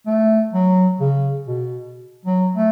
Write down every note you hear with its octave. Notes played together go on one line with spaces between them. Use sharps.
A3
F#3
C#3
B2
F#3
A3